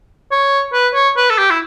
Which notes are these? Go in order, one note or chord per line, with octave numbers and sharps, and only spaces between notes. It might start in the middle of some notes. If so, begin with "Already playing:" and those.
C#5
B4
C#5
B4
A4
G4
E4